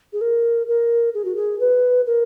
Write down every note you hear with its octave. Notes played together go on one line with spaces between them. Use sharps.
G#4
A#4
A#4
G#4
F#4
G#4
B4
A#4